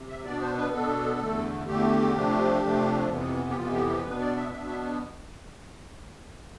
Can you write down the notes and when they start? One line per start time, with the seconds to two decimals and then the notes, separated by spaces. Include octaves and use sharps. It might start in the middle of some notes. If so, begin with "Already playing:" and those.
Already playing: C3
0.09 E5
0.25 B2 B3 D4 D5
0.41 C5
0.57 B4
0.73 B2 B3 D4 A4
1.20 E2 D3 A3
1.67 E2 D3 A3 G4
2.15 C3 F3 A3 D4
2.63 C3 F3 A3 D4
3.10 F2 C3 E3 B3
3.50 G4
3.57 F2 C3 E3 B3 F4
3.72 G4
3.89 G4
4.04 B2 B3 D4 B4
4.20 D5
4.36 E5
4.52 B2 B3 D4 E5
4.70 E5